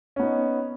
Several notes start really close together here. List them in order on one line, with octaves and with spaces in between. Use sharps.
C#4 B3 D#4